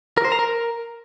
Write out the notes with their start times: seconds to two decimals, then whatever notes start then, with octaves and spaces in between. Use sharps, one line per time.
0.17 A#4
0.25 C5
0.32 A#5
0.39 A#4